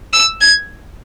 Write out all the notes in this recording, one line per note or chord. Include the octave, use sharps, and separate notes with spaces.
E6
G#6